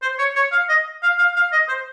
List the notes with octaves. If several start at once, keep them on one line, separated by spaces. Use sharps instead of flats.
C5
C#5
C#5
F5
D#5
F5
F5
F5
D#5
C5